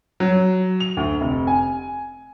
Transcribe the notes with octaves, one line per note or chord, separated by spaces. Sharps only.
F#3
F7
D2
F1
G#5